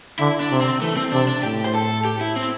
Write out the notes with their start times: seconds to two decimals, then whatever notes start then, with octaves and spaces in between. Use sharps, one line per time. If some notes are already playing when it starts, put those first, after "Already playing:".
0.19 D3 E4
0.41 D4
0.51 C3
0.61 C4
0.81 E3 A3
0.97 C4
1.12 C3 D4
1.28 D4
1.43 A2 G4
1.66 C5
1.74 A4
2.05 G4
2.21 E4
2.36 C4